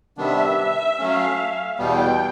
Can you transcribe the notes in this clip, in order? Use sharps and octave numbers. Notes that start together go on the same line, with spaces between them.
C3 D#3 G3 B3 D4 E5
E5
F#3 A3 C#4 F5
E2 B2 G3 B3 G5